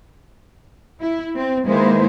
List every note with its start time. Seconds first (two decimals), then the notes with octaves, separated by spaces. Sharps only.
1.01 E4
1.35 C4
1.66 D#3 G#3 A#3 E4 B4 C5